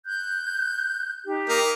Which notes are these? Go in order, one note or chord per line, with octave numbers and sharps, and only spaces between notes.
F#6 G6
D#4 G4
A#3 A#4 D#5